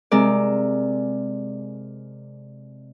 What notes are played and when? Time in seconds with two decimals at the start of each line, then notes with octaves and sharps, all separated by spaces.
0.12 C3 G#3 A#4 D5